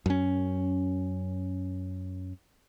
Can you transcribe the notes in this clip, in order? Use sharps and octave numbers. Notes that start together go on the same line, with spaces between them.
F#2 C#4